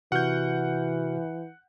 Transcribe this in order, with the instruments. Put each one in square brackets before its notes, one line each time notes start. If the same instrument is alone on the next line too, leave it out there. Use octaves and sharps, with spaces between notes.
[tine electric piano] C3 F#4 F6 [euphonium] E3 [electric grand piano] F#5 G6